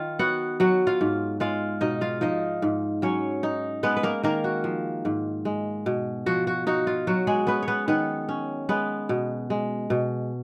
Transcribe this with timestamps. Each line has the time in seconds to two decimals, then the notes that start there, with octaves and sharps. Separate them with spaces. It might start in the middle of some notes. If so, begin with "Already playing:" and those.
Already playing: D#3 F4 F5
0.19 B3 F#4 F#5
0.60 F#3 F#4 F#5
0.87 F4 F5
1.01 G#2
1.40 G#3 F4 F5
1.81 B2 D#4 D#5
2.01 F4 F5
2.21 F3 D#4 D#5
2.62 G#2
3.02 F#3 C#4 C#5
3.43 D#4
3.83 G#3 B3 B4
3.97 B4
4.03 A#3 A#4
4.23 D#3 A#3 A#4
4.44 F#4
4.64 F3
5.05 G#2
5.45 G#3
5.86 B2
6.26 F3 F#4
6.47 F#4
6.67 D#4 F#4
6.87 F4
7.07 F#3 F#4
7.27 G#3 G#4
7.47 B3 C#4 B4
7.62 C#5
7.68 B3 B4
7.88 D#3 B3 B4
8.29 C#4
8.69 G#3 B3 B4
9.09 B2
9.50 G#3
9.90 B2